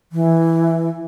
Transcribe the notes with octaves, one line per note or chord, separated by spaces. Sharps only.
E3